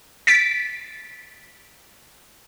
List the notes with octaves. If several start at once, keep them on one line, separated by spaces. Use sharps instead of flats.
A6 B6 D7